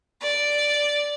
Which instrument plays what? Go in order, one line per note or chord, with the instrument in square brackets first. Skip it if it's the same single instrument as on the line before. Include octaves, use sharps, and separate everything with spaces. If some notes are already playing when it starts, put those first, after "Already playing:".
[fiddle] D5